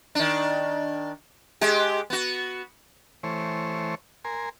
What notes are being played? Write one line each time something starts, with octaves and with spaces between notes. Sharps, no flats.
D#3 D4
G#3 G4
B3 F#4
E3 A3 C5 C#5
A#4 G#5 C6